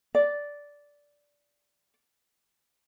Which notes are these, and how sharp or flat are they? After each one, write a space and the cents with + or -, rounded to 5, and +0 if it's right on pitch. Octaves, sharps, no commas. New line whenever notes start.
D5 -10